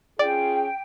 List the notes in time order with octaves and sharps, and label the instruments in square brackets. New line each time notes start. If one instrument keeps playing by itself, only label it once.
[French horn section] C#4 F4 G#4 [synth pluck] D5 [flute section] G5